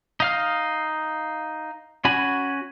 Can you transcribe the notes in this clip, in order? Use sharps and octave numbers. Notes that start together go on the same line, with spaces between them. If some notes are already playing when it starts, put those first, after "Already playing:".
D#4 F5 F6
C#4 F#4 G#5 B5